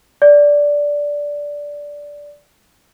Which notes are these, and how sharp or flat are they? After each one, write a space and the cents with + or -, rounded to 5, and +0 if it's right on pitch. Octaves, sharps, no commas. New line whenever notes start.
D5 -10